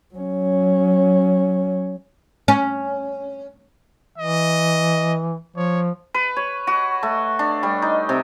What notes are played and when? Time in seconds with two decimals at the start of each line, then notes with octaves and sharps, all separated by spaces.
0.14 F#3 C#4
2.48 C#4
4.18 E3 D#5
5.56 F3 C#5
6.14 B4
6.36 C#5
6.67 F#4
7.03 A3
7.39 D4
7.63 G3
7.82 D#4
8.09 C3